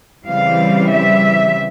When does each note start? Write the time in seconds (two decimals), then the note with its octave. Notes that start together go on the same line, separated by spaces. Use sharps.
0.25 C#3 E3 G3 C4 F5
0.88 E5